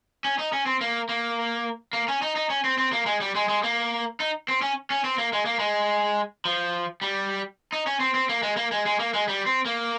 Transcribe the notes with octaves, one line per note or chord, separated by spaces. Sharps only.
C#4
D#4
C#4
C4
A#3
A#3
A#3
C#4
D#4
D#4
C#4
C4
C4
A#3
G#3
G3
G#3
G#3
A#3
D#4
C4
C#4
C#4
C4
A#3
G#3
A#3
G#3
F3
G3
D#4
C#4
C4
C4
A#3
G#3
A#3
G#3
G#3
A#3
G#3
G3
C4
A#3